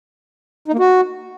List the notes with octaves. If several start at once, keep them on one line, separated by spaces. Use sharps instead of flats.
D#4
A#3
F#4